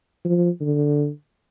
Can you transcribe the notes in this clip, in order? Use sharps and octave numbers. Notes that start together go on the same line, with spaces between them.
F3
D3